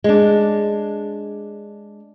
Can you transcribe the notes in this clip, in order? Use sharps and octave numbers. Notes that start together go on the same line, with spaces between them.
G#3 D4